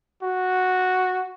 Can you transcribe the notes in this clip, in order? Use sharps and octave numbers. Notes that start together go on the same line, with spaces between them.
F#4